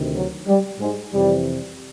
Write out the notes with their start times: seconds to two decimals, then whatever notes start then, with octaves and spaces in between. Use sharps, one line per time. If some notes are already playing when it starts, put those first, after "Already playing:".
Already playing: D2 C3 D#3
0.16 F#3
0.48 G3
0.80 G#2 G#3
1.13 F2 C3 E3 G3